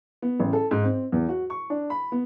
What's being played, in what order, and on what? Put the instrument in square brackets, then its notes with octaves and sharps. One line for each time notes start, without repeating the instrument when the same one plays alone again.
[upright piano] B3
A1
A4
G#2
C4
E2
F#4
C#6
D4
B5
B3